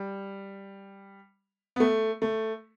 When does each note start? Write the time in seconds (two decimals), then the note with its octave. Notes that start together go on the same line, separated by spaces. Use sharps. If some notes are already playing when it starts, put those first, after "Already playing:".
Already playing: G3
1.76 B3
1.80 A3
2.22 A3